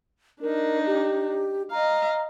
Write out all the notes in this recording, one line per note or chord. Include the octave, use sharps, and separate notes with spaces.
D4 D#4 A#4
G4
D#5 F5 A#5